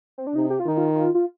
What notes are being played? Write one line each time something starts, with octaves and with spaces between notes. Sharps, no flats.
C4
D4
C3 D#4
G4
F4
D#3 D#4
F4
F4
F4